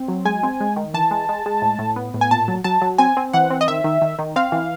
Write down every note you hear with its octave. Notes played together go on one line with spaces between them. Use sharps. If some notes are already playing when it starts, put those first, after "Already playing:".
Already playing: C4
F#3
G#3 G#5
C4
G#3
D#3
E3 A5
G#3
G#3
G#3
A2
A2
B3
A2
G#5
A#2 A5
F#3
F#3 A5
F#3
C4 G#5
C4
E3 F#5
C4
D#5
D#3 E5
D#3
D#3
D#3
C4 F5
E3